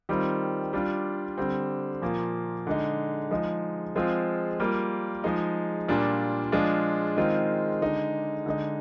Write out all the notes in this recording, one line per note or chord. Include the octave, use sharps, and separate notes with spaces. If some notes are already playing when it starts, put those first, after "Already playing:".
D#3 G3 C4 F4
G3 D4 F4
D3 G3 C4
A#2 F3 A#3
D3 G#3 D#4
F3 G#3 D#4
F3 G#3 C4 F4
G3 A#3 F4
F3 G#3 D#4
A#2 G3 D4 F4
F3 G#3 D4 F4
D#3 G#3 C4 F4
D3 G#3 D#4
D3 G#3 D#4